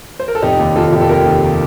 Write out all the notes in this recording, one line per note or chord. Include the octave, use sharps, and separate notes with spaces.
C5
A#4
A4
F1 D#4 G4
D#2
D#2 F4 A4
F1 G4
A4
F1 G4 A#4
D#2
D#3